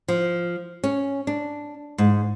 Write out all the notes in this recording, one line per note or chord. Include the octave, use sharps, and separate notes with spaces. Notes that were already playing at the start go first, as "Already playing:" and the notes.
F3
C#4
D4
G#2